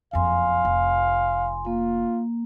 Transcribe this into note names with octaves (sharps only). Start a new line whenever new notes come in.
F#1 F2 F5 G#5 C6
F1
A#3 F4